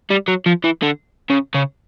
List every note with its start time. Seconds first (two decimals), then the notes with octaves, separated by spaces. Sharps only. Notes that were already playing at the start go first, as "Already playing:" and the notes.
0.11 G3
0.28 F#3
0.46 F3
0.64 E3
0.82 D3
1.30 C#3
1.54 C#3